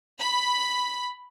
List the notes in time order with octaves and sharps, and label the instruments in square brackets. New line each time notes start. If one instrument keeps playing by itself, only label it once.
[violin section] B5